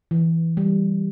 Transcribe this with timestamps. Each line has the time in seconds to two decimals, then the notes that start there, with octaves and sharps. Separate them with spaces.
0.11 E3
0.57 G3